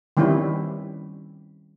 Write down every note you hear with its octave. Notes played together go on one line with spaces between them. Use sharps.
D#3 G3 C4 C#4 E4